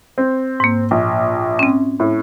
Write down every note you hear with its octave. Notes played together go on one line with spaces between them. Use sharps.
C4
G#2 A#3
A#1
C4 C#4
A2